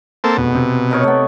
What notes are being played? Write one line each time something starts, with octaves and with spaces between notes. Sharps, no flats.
A#3 C4 A4
F1 E2 B2
C3
D#4 A#4 C#5
A3 B3